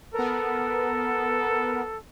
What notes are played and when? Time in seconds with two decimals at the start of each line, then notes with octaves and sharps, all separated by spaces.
0.14 B3 A4 A#4